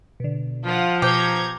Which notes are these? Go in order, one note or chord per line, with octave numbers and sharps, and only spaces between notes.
B2 D3
F3 F4 F#5
B2 G4 C5 A#5 G6 G#6 C#7